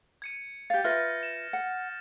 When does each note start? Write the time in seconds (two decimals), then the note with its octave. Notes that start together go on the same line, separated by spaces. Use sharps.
0.22 G#6 C#7 D#7
0.70 G4 F5 G6 A6
0.84 F4 B4 E5 F6 A6 A#6
1.23 E7
1.53 F#5